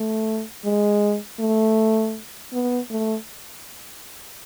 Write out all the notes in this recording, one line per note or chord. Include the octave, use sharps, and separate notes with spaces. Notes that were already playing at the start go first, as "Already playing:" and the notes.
Already playing: A3
G#3
A3
B3
A3